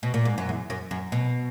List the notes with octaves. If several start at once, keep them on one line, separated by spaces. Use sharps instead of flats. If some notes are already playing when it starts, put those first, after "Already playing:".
B2
A#2
G#2
F#2
E2
F#2
F#2
B2